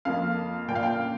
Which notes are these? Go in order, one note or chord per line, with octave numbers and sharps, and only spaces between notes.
F2 F3 A#3 F4 F5
A#2 A#3 F4 G5
F5
G5